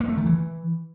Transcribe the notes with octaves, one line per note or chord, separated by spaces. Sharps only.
A#3
A3
D#3
E3